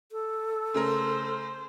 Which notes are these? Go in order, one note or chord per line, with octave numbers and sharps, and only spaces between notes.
A4
C#3 A3 A#4 C5